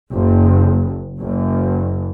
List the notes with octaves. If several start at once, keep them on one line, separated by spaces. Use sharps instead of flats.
F#1
F#1